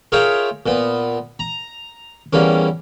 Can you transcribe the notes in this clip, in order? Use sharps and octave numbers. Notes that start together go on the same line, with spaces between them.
F4 G#4 A#4 C#5 E5 G5
A#2 B3
A#5
E2 G3 A#3 C#4